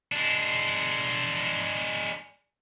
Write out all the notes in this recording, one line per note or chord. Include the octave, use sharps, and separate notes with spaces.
G#3 D4